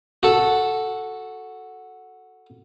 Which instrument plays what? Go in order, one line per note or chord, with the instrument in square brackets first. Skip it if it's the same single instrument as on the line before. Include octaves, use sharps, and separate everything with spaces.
[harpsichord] F#4 A4